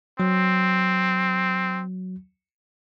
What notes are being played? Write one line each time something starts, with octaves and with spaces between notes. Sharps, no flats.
F#3 C4